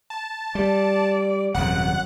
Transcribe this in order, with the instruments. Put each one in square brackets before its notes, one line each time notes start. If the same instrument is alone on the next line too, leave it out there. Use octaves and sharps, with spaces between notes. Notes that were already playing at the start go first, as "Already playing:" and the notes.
[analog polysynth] A5
[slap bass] G3 [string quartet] D5
[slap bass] D#1 C3 [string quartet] F#2 [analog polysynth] F#5 F#6